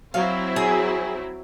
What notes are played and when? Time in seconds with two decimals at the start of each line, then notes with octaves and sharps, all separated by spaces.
0.14 F#3 C4 E4 F5
0.56 G#4